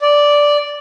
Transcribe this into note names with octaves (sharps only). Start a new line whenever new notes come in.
D5